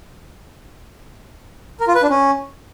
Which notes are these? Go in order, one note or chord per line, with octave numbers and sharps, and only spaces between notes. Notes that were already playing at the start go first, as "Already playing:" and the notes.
A#4
F4
B4
D4
C#4